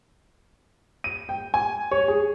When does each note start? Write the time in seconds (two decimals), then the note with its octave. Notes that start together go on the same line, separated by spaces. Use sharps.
1.04 D#7
1.29 G5
1.54 G#5
1.91 C#5
2.08 G#4